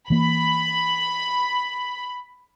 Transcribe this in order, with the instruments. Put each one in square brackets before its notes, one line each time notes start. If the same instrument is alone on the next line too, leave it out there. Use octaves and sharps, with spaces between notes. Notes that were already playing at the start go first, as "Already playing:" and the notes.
[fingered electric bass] E3 A#3 [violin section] B5